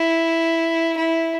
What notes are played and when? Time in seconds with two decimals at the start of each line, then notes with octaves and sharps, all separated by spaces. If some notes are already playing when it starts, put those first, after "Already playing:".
Already playing: E4
0.97 E4